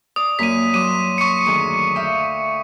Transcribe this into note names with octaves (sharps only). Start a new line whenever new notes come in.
D5 D#6
F#2 A#3 B6 D#7
F#3 C6 D6 D#7
C#6 C#7
D2 D#3 G#4
E5 F5 G5